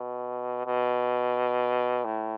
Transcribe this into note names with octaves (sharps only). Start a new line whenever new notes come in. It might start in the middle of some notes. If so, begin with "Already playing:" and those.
Already playing: B2
B2
A2